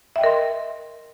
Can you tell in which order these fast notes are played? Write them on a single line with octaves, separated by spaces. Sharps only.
E5 G5 D#5 A#4 C6